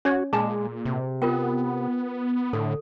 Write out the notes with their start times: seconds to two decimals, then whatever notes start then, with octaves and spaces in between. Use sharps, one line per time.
0.05 C#4 F#4 C#5 G#6
0.33 A#2 G#3 G#4 G#5 A5
0.85 C3
1.22 B3 F4 A#4 G5
2.53 A2 D3 A4